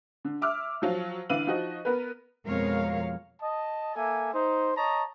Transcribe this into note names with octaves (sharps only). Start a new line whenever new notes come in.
D3
E5 D6 E6 F6
F3 F#3 F5
D3 E3 F5 D#7 F#7
F3 D#4 F#4 D#5
B3 A#4 B4
F2 B2 G#3 A#4 C#5 F5
D#5 A5
A#3 A4 E5 G#5
D#4 C5
C#5 D#5 A5 A#5